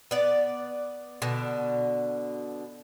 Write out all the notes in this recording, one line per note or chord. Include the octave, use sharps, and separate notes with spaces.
B3 D5
B2 D3